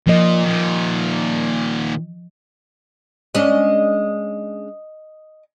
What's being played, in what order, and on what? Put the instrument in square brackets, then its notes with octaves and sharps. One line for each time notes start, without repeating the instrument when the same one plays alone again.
[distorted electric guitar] A#2 [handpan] F3 D#5
[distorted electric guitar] A#2 D#3
[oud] G#3 C#4 D4 [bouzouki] D#5